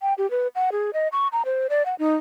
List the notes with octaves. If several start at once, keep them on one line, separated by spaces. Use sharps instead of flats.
G5
G4
B4
F#5
G#4
D#5
C#6
A#5
C5
D5
F#5
D#4